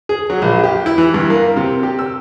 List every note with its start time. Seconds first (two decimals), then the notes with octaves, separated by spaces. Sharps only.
0.09 G#4
0.30 F#3
0.42 A#1
0.63 G4
0.86 E4
0.98 E3
1.14 G2
1.30 A#3
1.56 C3
1.83 G4
1.99 E6